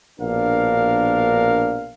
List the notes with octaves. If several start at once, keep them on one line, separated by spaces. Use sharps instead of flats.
A#1 B2 D4 A#4 F5